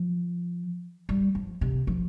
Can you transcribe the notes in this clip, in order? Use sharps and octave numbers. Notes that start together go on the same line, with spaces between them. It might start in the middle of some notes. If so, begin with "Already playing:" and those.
Already playing: F3
G3
F3
C3
F3